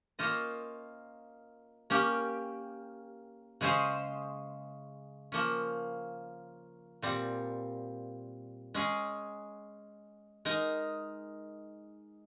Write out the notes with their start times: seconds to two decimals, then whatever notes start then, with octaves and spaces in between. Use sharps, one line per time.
0.19 A#3 C#4 F4 C5 D#5
1.90 A#3 C#4 G4
3.61 C#3 G#3 C#4 G#4 C5
5.32 F3 A#3 C#4
7.02 A#2 G3 C4
8.74 G#3 C#4 G#4
10.45 G#3 D#4 A#4 D#5